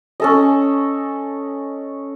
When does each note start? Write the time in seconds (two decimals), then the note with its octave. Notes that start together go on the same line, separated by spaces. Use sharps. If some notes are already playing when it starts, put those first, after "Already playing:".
0.20 C#4 A4 D#5